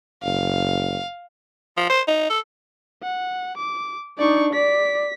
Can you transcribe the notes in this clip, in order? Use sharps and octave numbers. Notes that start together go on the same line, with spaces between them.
F#1 F5
F3
C5
D#4
A4
F#5
D6
D4 D#4 D5 C#6
D5 B6